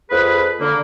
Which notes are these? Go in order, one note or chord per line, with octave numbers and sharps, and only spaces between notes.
F2 G#4 B4
D3 A#3